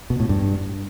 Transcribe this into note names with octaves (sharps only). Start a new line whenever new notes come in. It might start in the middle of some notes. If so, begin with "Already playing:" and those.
B2
A2
G2